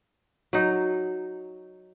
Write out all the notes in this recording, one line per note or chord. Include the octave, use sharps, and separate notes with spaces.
F#3 D#4